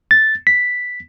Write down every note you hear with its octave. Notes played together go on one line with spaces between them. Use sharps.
A6
B6